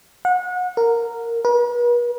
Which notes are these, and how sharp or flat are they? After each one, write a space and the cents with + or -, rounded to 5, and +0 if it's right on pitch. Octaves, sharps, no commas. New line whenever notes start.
F#5 -30
A#4 -10
B4 -45